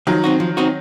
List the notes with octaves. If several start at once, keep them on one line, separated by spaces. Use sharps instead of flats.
D#3 F3 F#3
C4 D#4 F#4
F3
C4 D#4 F#4